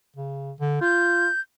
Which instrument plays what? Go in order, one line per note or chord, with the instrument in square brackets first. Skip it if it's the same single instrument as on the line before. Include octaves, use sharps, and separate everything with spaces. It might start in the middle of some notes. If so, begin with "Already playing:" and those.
[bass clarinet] C#3
D3
[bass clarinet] F4 [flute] G6